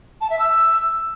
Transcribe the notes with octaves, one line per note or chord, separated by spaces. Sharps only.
A5
E5
E6